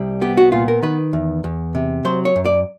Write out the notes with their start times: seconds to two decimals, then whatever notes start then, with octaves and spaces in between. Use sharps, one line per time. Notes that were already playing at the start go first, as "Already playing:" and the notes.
Already playing: C2 G3
0.21 B3 G4
0.37 F#4
0.52 A#2 F4
0.68 A#4
0.83 D#3 B4
1.13 E2
1.44 E2
1.75 C3
2.05 F#3 C5
2.25 C#5
2.36 F#2
2.45 D5